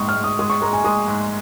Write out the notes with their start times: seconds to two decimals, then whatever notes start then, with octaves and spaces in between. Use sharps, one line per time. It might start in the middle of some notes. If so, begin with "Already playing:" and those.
Already playing: A#1 G#2 G#3 C#6 D#6
0.09 F6
0.16 G#2
0.24 D#6
0.39 G#3 D#6
0.50 C#6
0.62 G#3 A#5
0.73 G#5
0.84 G#3 D#6
1.08 G#2